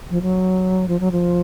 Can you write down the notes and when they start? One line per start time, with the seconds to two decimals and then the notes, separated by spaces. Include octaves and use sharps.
0.10 F3
0.22 F#3
0.88 F3
1.00 F#3
1.12 F3